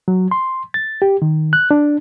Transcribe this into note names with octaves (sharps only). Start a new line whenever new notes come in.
F#3
C6
A6
G4
D#3
F#6
D4